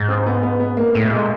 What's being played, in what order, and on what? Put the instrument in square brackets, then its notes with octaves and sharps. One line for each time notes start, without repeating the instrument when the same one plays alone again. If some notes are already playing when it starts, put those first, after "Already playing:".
Already playing: [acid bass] G#2
[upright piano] C4
C4
B3
B3
B3
A#3
[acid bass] A2 [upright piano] A3
[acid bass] B2
[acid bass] A#2 [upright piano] G#3